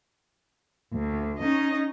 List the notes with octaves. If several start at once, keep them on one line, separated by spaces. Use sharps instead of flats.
D2
C#4 D#4 D#5